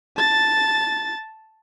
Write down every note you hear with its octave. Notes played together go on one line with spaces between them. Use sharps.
A5 A6